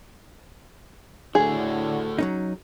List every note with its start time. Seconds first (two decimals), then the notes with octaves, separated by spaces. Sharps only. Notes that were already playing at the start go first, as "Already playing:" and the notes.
1.35 A2 D3 A3 F#4 G#4
2.18 F#3 C#4 D#4